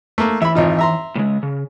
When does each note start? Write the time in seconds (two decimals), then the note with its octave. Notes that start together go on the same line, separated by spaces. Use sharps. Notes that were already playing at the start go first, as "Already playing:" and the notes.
0.18 A3 A#3
0.42 E3 E5 B5
0.55 G#1 D#4 F4
0.79 E5 A#5 C6
1.16 A2 C#3 G#3
1.43 C#3